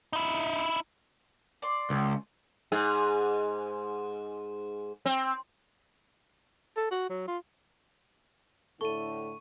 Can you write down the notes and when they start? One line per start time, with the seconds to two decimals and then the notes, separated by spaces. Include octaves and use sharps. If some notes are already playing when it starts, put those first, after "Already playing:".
0.13 D#4 E4
1.62 D5 C6
1.90 C#2
2.72 G#2 G#4
5.06 C4
6.76 A4
6.91 F#4
7.09 F#3
7.27 F4
8.81 A2 D3 A3 A4 C#6 D#7